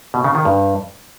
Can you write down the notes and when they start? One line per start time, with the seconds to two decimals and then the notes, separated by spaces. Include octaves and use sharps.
0.14 B2
0.24 C#3
0.35 D#3
0.45 G2